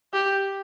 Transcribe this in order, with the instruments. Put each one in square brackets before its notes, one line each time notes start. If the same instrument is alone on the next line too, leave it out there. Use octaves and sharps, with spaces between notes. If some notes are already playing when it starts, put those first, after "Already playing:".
[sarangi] G4